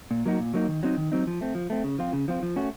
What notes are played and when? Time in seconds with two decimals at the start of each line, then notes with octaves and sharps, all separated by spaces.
0.11 A#2
0.26 F#3 A#3 D#4 F#4
0.40 A#2
0.54 F#3 A#3 D#4 F#4
0.68 D#3
0.83 F#3 C4 D#4
0.97 D#3
1.12 F#3 C4 D#4
1.27 F3
1.41 A3 C4
1.55 F3
1.70 A3 C4
1.84 C#3
1.99 F3 C4 F4
2.13 C#3
2.28 F3 C4 F4
2.43 F3
2.56 A3 C#4 F#4